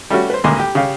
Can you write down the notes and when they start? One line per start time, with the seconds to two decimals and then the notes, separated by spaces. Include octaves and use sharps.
0.10 G3 A3 C#4 F#4
0.30 B4 C5
0.44 A1 D2 G#3 A#3 C6
0.59 G4
0.75 C#3 G4 F5